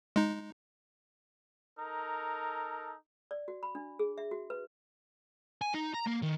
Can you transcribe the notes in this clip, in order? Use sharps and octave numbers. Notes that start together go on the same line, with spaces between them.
G#3 D#4
D#4 A4 A#4
D5
F#4
B5
D4
G#4
E5
F#4
B4
G#5
D#4
A#5
A#3
D#3